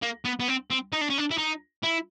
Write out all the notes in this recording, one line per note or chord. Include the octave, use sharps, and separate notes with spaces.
A#3
B3
B3
C4
C4
D#4
D4
C#4
D4
E4
D#4
E4